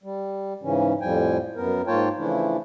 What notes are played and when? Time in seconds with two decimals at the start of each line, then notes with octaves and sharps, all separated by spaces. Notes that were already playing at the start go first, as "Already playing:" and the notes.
0.03 G3
0.63 G#2 C#3 E3 C#4
1.01 F2 A2 F3 G3 G5 G#5
1.56 F#2 B3 A#4
1.87 G#2 A#3 F4 C#5 G5 A5
2.18 C#3 E3 F3 A3 D4 E4